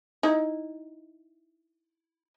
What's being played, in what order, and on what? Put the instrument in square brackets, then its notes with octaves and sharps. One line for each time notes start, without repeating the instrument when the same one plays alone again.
[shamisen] D#4 E4